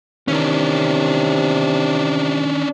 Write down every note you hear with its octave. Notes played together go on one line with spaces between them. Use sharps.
C3 D#3 E3 C#4 D4